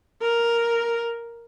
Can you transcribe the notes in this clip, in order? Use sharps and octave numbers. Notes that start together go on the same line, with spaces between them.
A#4